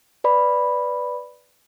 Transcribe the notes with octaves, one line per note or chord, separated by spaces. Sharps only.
B4 D5 B5